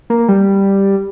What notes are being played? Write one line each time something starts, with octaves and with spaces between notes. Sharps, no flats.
A#3
G3